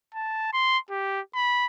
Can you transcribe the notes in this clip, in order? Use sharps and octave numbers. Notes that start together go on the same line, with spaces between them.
A5
C6
G4
B5